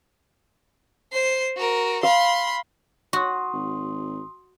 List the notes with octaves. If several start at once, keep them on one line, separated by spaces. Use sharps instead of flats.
C5 C7
F#4 A#4
F5 B5 C6
F#4 C6 D#6
G#1